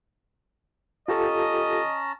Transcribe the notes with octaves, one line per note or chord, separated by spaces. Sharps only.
C#4 F4 G4 A4 D#5 A5 A#5